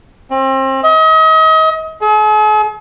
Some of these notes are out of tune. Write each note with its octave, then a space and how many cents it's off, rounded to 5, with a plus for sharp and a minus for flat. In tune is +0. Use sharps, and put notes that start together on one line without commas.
C4 +35
D#5 +35
G#4 +45